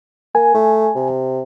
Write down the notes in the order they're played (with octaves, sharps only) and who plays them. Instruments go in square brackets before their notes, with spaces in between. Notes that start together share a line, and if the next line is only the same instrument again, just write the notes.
[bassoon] A#3 [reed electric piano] G#5
[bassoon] A3
C3